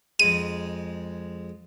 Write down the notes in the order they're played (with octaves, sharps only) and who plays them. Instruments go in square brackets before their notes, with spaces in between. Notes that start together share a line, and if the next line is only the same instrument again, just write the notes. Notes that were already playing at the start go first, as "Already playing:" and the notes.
[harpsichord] F2 G#3 [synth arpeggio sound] D#7